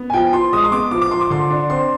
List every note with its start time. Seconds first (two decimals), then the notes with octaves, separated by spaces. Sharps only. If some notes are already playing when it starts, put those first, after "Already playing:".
Already playing: B3
0.10 G#5
0.13 F3 G5
0.33 F3 C6
0.53 G#3 D#6
0.64 C6
0.72 B3 D6
0.91 F3 D6
1.01 D6
1.11 F3 C6
1.21 D6
1.30 D3 C6
1.51 D4
1.69 C4 C6